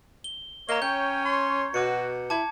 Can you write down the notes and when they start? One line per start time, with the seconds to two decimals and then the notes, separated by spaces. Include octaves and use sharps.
0.24 G7
0.69 A#3 C#5 D#5 A#5 G7
0.82 C#4 G5 G6
1.25 C6
1.74 B2 F#4 D6 C#7
2.30 E4 A5 D6 G#6